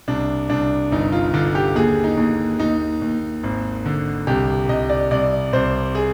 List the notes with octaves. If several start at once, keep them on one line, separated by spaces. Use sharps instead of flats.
C2 D4
C2 D4
G1 D#4
F4
D3 F4
G4
D#2 G#4
D#4
D#2
D#2 D#4
D#2
G#1
D3
C2 G4
C2 D#5
D5
C2 D5
C2 C5
G#4